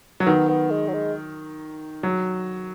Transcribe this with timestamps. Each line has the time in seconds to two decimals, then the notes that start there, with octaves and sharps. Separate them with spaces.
0.20 F#3
0.27 D#3 B3
0.49 B3
0.71 G#3
0.88 F#3
0.93 G#3
2.03 F#3